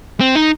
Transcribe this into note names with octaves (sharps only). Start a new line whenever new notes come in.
C4
D#4